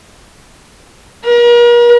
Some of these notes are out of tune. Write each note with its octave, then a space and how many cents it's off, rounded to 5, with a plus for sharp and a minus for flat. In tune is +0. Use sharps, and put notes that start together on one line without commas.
A#4 +40